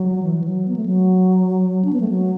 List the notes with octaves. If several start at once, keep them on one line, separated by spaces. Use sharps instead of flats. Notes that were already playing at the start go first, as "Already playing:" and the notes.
Already playing: F#3
E3
F#3
B3
A3
F#3
D4
B3
A3
F#3